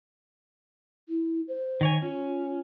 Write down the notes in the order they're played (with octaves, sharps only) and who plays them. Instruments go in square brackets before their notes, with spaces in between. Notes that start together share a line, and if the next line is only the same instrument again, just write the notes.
[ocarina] E4
C5
[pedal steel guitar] D#3 C#5 G#5
[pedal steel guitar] C#4 [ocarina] F4